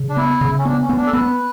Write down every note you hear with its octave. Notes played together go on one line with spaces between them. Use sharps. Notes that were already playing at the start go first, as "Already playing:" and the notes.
Already playing: C#3
D4
B3 E4
C#3
C#4
B3 D4
C#4
B3
D4
A4
B3 B4